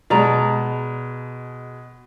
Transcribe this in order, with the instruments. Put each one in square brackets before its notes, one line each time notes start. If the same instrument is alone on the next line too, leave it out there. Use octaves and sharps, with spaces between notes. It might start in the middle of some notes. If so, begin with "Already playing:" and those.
[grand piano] B2 G#3 [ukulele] D5 A#5